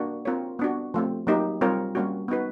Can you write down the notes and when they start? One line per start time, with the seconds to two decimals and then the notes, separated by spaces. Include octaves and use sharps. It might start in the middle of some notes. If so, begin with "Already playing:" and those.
Already playing: A#3 D4 F#4
0.25 C4 F4 A#4 C#5
0.59 B3 D4 F#4
0.94 F3 A3 C4
1.27 F#3 A#3 D#4 G4
1.61 G3 C4 F4 A#4 C#5
1.95 G3 A#3 C#4 F#4
2.28 B3 D#4 F#4 B4